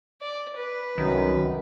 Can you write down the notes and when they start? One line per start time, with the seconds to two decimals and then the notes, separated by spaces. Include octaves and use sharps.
0.22 D5
0.57 B4
0.98 C2 F#2 D#3